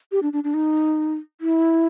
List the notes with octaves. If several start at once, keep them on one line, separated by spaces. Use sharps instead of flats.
G4
D4
D4
D4
D#4
E4